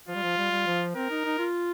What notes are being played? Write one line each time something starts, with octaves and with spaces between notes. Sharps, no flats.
F3 F4
G3
F3
G3
G3
F3
C4 A#4
D#4
D#4
F4